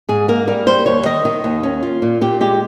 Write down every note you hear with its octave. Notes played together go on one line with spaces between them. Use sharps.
G#2 G#4
A#3 A#4
G3 A#4
G3 C5
D#2 C#5
D#3 D#5
D#3
D#2
C#4
F4
A#2
A#2 G4
G#3 G4